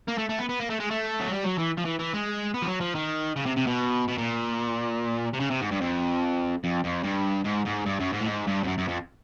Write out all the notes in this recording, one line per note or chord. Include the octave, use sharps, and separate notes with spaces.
A#3
A3
A3
B3
B3
A#3
A3
G#3
A3
F#3
G3
F#3
E3
F3
E3
E3
G#3
B3
F3
F#3
F3
D#3
C#3
C3
C3
B2
B2
A#2
C3
C#3
C3
G#2
G2
F2
F2
F2
G2
G#2
G#2
G2
F#2
G#2
A2
G#2
G2
F2
F#2
F#2
F2